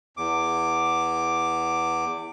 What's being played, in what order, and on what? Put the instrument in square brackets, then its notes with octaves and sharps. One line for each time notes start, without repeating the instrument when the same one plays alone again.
[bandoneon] E2 D6